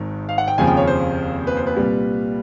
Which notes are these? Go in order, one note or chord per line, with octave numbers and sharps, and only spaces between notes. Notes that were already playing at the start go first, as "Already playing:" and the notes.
Already playing: G#1 G#2 D#3
F5
F#5
G5
F1 D#2 C#3 F3 G#5
G5
C#5
C5
B4
C5
B4
C2 A#2 G3